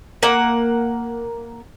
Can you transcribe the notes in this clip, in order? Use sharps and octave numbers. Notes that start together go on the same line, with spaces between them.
A#3 F#5